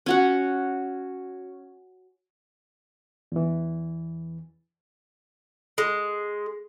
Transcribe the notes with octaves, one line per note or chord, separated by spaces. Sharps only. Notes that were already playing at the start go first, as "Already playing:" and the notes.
C#4 F#4 F#5
E2 E3
G#3